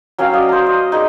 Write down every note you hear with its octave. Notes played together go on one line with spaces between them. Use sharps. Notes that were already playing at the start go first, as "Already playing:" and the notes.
F#3 C#4 F5 G5
D5 D#5
C5 A#5
D#5
D#4 G#4 D5